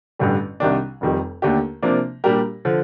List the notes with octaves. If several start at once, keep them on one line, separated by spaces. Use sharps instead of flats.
A1 G2 D3 G3
C2 C3 D#3 G3 D4
F1 F2 D#3 G3
D#2 D3 A3 D4 G4
C3 F3 A#3 D4
A#2 G3 D4 G4 A#4
D3 F3